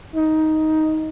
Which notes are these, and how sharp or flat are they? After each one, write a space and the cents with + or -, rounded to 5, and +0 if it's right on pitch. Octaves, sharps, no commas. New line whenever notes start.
D#4 +10